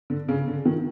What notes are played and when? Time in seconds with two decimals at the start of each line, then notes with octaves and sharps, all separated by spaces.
0.10 D3
0.29 C#3
0.47 D3
0.65 D#3